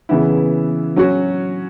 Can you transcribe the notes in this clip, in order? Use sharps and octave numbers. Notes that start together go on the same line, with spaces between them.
C#3 E3 B3 E4
F#3 C#4 F#4